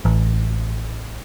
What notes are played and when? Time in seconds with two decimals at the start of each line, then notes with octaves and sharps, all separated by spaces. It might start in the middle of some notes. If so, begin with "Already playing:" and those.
0.05 A1